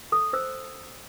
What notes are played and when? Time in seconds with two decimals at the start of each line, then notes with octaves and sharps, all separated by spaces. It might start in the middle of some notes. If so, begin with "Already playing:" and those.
0.12 A4 D#6
0.33 C5 E6